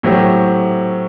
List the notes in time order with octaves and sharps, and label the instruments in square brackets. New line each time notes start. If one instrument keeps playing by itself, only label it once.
[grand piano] A2 F#3 C4 G4